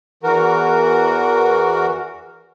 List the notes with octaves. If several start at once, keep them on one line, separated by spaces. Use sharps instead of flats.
E2 E3 F#4 A#4